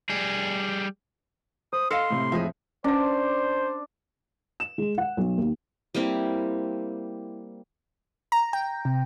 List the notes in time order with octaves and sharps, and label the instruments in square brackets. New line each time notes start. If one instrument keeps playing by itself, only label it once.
[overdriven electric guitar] G3 G#4
[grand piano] C5 [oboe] D#6
[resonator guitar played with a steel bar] A4 D#5 F5 [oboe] C6 [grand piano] F6 C#7 E7
[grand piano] A2 C3
[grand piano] F2 A2 F3 [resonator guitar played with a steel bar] G#4 D#5 E5
[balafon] C#4 D5 [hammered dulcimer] D4 [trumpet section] C5
[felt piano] E7
G#3
F#5
B1
D#2
[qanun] G3 A#3 C4 E4
[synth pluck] A#5
G5
C3